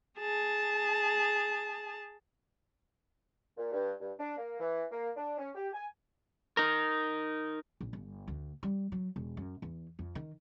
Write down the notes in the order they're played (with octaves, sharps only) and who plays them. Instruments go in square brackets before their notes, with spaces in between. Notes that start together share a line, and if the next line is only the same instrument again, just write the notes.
[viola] G#4 A5
[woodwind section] A#2
G2
G2
D4
A#3
E3
A#3
D4
C#4
G4
G#5
[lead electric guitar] D#4 A#4
[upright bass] A#1
G1
D2
G3
F#3
E1
F#2
E2
F2
D#3